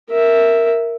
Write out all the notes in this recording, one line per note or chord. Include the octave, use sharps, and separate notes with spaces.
A#4 E5